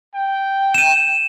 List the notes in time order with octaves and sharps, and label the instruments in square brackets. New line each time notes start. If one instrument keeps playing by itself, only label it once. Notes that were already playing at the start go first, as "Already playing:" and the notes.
[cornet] G5
[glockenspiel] D#7 E7